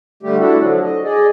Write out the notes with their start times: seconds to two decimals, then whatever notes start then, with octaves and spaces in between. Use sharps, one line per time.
0.23 D3 G3 A3 G4
0.40 D4 E4 F#4 A4
0.59 D3 F3 F#3
0.82 D#5
1.04 G#4 D5 D#5